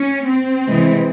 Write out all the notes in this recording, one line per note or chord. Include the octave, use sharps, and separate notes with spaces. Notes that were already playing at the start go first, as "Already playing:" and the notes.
Already playing: C#4
C4
C3 E3 G#3